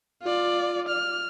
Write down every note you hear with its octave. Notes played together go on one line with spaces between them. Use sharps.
F4 D5
F6